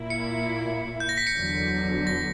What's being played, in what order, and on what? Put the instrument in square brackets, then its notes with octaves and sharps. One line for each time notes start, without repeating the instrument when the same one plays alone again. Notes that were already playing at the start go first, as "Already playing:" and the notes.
Already playing: [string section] A#2 A#3 E4
[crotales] C#7
G6
A#6
B6
C#7
[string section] E2 D3 F#3
[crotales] A#6